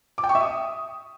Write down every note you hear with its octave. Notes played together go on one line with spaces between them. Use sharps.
D6
G5
C#6
E5
D#6